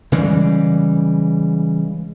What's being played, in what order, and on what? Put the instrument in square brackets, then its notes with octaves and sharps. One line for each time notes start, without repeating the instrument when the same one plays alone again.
[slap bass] C#3 E3 G3 G#3